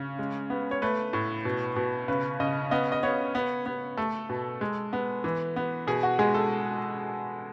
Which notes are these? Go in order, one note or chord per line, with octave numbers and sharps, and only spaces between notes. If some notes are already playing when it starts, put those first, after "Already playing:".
Already playing: C#3
G#3
B3
C#5
A3 B4
A2
B2
B2
C#3 B4
C#3 D#5
B3 D#5
D#5
B3 C#5
B3
B3
A3 A4
B2
G#3
B3
E3
B3
B2 G#4
F#4
G#3 G#4
A4